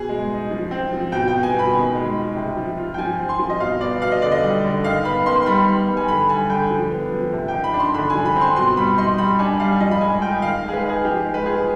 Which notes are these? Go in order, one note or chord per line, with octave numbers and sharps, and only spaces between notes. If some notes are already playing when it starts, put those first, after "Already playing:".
Already playing: B2 G#4
G#3
D#4
F3
C4
F3
B2 G5
G5
B3
G#5
B2
B5
D#3
G#3
F4
C3
F3
F4
G5
F3 G#5
C4
C6
F3
D#5
B2 F5
B3 D5
B2 F5
D#5
D3 D5
D#5
G3
D3
D#3 F5
B3 B5
D#3 C6
C6
G3 B5
B3
G3
G#5
D3 B5
G3 G#5
D3 G5
F3
B3
F3
C3
D#3 G5
B5
D4
C6
D3 B5
G#5
F3
B5
C4
C6
B2 C6
G3 B5
D#4 C6
G3 B5
D4 G#5
G3 F5
F3 D#5
B5
G#3 G#5
F4 G5
D#3 F5
G#3
G#4
B4
D#4
G#4
F3 G4
G#3
B4
F4 G#4